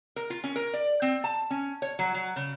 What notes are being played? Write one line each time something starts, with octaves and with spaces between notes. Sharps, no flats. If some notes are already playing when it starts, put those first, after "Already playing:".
A#4
F4
C#4
A#4
D5
C4
A5
C#4
C#5
F#3
F#3
C#3